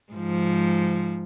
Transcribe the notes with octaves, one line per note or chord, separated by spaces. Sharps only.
G#2 F3